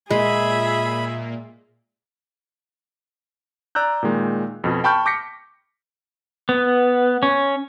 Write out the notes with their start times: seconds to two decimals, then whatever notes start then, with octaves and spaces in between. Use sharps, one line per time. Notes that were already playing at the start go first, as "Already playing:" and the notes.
0.10 A#2 G#3 G#4 E5 B5
3.75 D5 A#5 E6 F#6 G6
4.03 A#2 D#3 G#3
4.64 F2 B2
4.84 G5 A5 B5 C#6 F6 G6
5.06 D6 G6 A#6 B6 C#7
6.49 B3
7.23 C#4